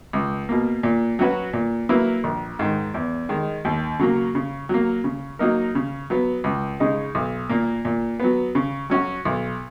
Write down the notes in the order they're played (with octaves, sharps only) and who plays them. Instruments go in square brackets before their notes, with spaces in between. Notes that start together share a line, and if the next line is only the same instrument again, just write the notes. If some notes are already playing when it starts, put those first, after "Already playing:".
[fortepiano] C#2
B2 A#3
A#2
F#3 C#4 F#4 B4
A#2
F#3 A#3 E4 B4
A#1
G#2 D#3
E2
D#3 G#3
D#2
C#3 F#3 A#3
C#3
F#3 A#3
C#3
F#3 A#3 D#4 A#4
C#3
F#3 B3
C#2
C#3 G#3 D#4
B1
A#2 A#3
A#2
F#3 B3
C#3
F#3 C#4 F#4
B1